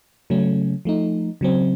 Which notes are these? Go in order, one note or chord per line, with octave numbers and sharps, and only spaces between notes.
C#3 F#3 A3 C#4
F3 A3 D#4
C#3 F#3 C4